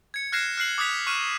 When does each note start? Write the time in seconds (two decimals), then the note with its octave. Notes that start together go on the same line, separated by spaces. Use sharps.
0.14 G#6 C#7
0.32 F6 F#6 G#6 A#6 C7 E7
0.57 F6 F#6 C7 F#7
0.78 D6 D#6 F#6 G#6 B6 F7
1.07 C#6 F6 F#6 D#7 E7